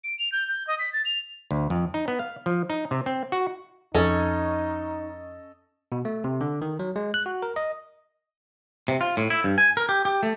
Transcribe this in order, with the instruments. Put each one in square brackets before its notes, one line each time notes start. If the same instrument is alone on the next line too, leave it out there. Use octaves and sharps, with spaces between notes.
[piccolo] D7
F7
G6
G6
D#5
B6
A6
F7
[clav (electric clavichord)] D2
F2
D#4
B3
F5
F3
D#4
C3
C4
F#4
[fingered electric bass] F2 [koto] C#4 [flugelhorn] D#4 [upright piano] A4 D#5
[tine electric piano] B2
A3
C3
D3
D#3
F#3
G#3
F#6
F#4
A#4
D#5
[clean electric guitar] C3
F4
A2
E4
G2
G#5
A#4
G4
G4
A3